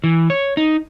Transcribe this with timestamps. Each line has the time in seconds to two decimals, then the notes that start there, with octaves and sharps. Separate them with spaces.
0.04 E3
0.30 C#5
0.57 D#4